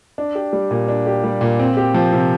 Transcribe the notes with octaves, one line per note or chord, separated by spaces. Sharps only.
D4
G4
G3
A#2
D4
G4
G3
A#2
C4
G4
F3
C3